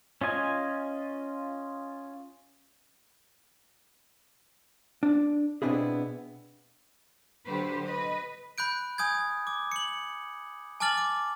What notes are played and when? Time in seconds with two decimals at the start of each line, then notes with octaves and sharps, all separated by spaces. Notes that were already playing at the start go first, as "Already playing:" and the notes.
0.21 C#4 F4 D#5 G#5
5.03 D4
5.62 B2 B3 C4 D4 E4 G#4
7.46 D3 F#3 G4 B4 C5
7.84 B4 D#5
8.58 B5 F#6 G6 D7
8.98 G#5 D#6 G6 G#6
9.47 D6
9.72 C#7 F#7
10.80 G#5 A5 D6 F6 A6 F#7
10.98 D6